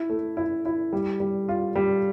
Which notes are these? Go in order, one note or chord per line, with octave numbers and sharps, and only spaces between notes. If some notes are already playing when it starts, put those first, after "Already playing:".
Already playing: E4
A3
E4
E4
G3
G3
F4
G3